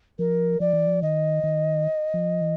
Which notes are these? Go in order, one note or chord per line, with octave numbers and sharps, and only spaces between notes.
F3 A#4
F3 D5
E3
F3
D#3 D#5
D#3
F3
E3